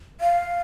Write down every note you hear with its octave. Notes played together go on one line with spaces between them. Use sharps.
F5